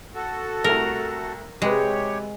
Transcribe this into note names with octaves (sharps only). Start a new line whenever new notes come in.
F#4 A4
C2 A3 A#4
C3 G#3 G4 B4 C#5